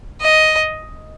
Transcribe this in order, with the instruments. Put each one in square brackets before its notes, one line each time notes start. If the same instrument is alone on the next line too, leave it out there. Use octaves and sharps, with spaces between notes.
[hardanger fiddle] D#5